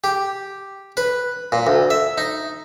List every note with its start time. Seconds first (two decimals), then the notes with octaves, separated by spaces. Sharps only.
0.04 G4
0.97 B4
1.52 A#2
1.67 D2
1.90 E5
2.18 D#4